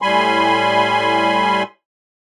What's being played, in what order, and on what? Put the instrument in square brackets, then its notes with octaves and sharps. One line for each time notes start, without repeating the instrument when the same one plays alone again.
[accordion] A2 G3 G#5 B5 C6